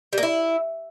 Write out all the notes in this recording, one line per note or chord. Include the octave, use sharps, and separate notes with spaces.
G3
A#3
E4